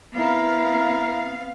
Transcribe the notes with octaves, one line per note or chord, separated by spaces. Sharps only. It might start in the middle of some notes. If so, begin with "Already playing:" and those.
B3 C4 E4 A#4 F5